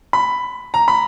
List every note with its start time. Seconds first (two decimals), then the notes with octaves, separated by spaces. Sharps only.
0.13 B5
0.74 A#5
0.88 B5